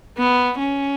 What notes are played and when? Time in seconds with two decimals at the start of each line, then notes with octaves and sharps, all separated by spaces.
0.18 B3
0.58 C#4